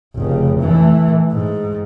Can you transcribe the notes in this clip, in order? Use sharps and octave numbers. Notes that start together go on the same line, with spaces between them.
F1 C#3
E3 A3
G#2